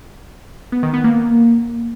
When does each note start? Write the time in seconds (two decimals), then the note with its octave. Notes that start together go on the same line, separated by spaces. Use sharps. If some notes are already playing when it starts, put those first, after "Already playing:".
0.72 B3
0.83 D#3
0.94 B3
1.04 A#3